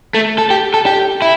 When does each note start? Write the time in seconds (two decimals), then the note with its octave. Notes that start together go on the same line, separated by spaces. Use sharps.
0.15 A3
0.38 A4
0.50 G4
0.74 A4
0.86 G4
1.22 E4